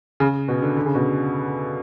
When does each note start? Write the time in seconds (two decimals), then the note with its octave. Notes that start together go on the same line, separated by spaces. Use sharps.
0.20 C#3
0.48 B2
0.62 D3
0.76 D3
0.86 C#3
0.95 B2